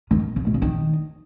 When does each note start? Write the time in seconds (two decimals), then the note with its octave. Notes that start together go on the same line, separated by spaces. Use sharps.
0.11 D#3
0.36 C#3
0.47 B2
0.54 C#3
0.62 D#3